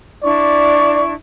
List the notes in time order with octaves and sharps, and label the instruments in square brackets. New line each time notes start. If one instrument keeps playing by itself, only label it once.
[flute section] D4 E4 C#6 [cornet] D5